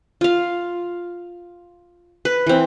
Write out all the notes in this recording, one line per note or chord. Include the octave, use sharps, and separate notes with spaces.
F4 F5
B4
E3 C4